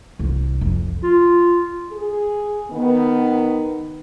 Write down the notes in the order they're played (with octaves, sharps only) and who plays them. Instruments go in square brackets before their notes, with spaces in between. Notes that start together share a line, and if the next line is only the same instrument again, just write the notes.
[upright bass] C2
F2
[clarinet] F4
[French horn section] G#4
D#3 B3